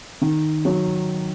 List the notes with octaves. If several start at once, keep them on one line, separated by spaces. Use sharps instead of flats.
D#3
F#3